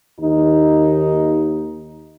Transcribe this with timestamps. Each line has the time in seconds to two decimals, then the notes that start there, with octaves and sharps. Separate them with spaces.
0.20 D#2 D#4